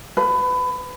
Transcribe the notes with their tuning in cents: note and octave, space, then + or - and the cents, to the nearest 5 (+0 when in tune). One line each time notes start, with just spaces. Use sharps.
B4 +25